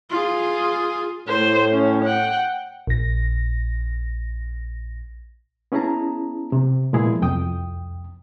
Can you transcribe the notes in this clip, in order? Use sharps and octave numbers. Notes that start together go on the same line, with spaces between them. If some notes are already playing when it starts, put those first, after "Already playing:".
F4 G#4
A2 C5 C#5
C#4
F#5 G5
A#1 A#6
B3 C#4 E4 G#4 A5 A#5
C3
A#2 F3 G#3 B3 E4 G#4
C2 F2 G5 D#6